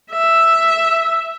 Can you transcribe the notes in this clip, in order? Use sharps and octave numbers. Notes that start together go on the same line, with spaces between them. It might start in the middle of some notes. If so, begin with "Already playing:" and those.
E5